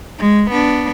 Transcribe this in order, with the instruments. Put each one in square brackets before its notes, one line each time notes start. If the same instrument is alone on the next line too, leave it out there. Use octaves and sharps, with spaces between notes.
[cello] G#3
B3 D4